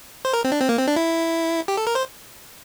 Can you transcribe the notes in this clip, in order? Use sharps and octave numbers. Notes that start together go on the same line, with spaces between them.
C5
A#4
C4
D4
C4
A#3
C4
D4
E4
G4
A4
A#4
C5